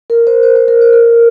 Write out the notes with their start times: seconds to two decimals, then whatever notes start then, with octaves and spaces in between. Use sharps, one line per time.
0.10 A#4
0.27 C5
0.43 C5
0.56 C5
0.68 A#4
0.81 C5
0.93 A#4